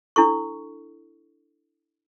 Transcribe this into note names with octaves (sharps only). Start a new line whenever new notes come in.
D4 E4 A4 C#6